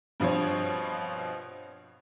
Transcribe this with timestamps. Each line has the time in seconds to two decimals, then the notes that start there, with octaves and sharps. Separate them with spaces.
0.20 G2 B2 F3 C4 C#5